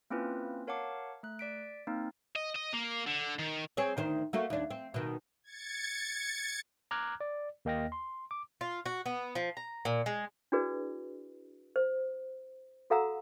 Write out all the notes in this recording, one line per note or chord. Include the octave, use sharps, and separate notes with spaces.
A#3 C4 C#4 E4 F4 B4
A#4 C#5 F5 F#5 A5 D6
A3 F#6
D5 B6 D7
A#3 C4 D#4
D#5
D#5
A#3
D3
D#3
C4 G#4 C#5
D2 D#3 C5
A3 A#3 F#4
D#2 D4
C4
B2 D#3
G#6 A6 C#7
A#5 D6 F6 F#6 G#6
D5
D#2 A#3 D#5 G5 F6 A#6
C6
D6
F4
F#4
B3
F3
A#5
A#2
G#3
D4 E4 F#4 G#4 B4 D5
C5
F#4 A4 F5 F#5 A#5 E6